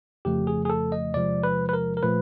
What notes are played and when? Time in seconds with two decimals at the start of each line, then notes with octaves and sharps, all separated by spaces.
0.25 G1 F2 C#3 F3 A3 G4
0.47 G#4
0.65 G#4
0.70 A4
0.92 D#5
1.14 E2 C3 F3 G#3 D5
1.43 B4
1.69 B4
1.73 A#4
1.97 A#4
2.03 A#2 F3 A3 B4